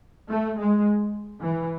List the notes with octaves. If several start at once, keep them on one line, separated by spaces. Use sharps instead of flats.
A3
G#3
E3